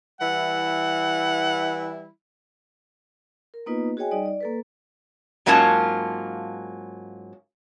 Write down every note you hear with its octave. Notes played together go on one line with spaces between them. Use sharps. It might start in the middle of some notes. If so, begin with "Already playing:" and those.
E3 G3 E4 F#5
A#4
A#3 B3 D#4 F4 B4 D#5
F#4 G#4 C#5 D#5 G5 G#5
G3 D#4 D5 D#5
D5
A#3 A4 B4
G#2 F#3 A#3 C#4 F4 A5